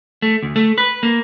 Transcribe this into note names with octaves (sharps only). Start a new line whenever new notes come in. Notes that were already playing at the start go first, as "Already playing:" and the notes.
A3
D2
A3
B4
A#3